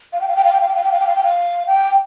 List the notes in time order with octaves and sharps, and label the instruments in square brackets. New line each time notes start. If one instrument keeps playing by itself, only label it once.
[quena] F5
G5
F5
G5
F5
G5
F5
G5
F5
G5
F5
G5
F5
G5
F5
G5